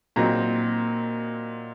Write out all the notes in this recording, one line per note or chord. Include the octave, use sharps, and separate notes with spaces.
A#2 F#3 C4 D#4 A#5